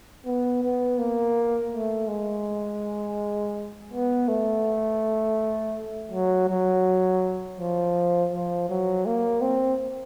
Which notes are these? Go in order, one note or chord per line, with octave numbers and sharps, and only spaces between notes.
B3
B3
A#3
A3
G#3
B3
A3
F#3
F#3
F3
F3
F#3
A#3
C4